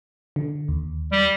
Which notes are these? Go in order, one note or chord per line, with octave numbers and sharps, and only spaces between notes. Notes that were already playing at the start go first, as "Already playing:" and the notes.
D3
D#2
G3